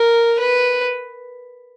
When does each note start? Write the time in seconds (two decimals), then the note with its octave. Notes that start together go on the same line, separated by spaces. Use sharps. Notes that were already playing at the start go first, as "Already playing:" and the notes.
Already playing: A#4
0.39 B4